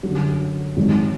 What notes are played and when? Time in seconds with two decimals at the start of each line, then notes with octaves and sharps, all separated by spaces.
0.03 F#2 D3 F#3
0.77 G#1 G#2 F#3